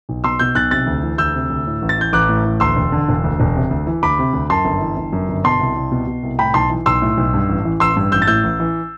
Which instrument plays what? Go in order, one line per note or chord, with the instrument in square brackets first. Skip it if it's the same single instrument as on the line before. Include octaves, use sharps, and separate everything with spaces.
[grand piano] B1
B2 C6 E6
B2 E6 G6
B1 F#6 A6
C3 F#6 A6
D2
E3
D2 E6 G6
C3
D2
A2
A1
A6
E3 G6
A1 D6 F#6
A2
A1
D2 C6 E6
E1
D3
E1
D2
E1
C3
D2
E3
D2 B5 D6
C3
D2
F#2 A5 C6
G1
E3
G1
F#2
G1
B2 A5 C6
C2
C2
B2
B2
C2
A2 G5 B5
B1 A5 C6
E3
B1 C6 E6
A2
B1
G2
A1
E3
A1 C6 E6
G2
A1 E6 G6
A6
A2 E6 G6
A1
E3